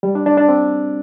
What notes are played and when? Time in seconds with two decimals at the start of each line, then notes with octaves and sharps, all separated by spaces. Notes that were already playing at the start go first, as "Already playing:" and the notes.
0.03 G3
0.15 D4
0.26 D4
0.37 D4
0.48 C4